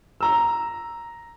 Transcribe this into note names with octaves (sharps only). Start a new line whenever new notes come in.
A#5 E6